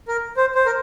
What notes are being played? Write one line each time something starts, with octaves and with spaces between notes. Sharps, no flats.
A#4
C5
C5
A#4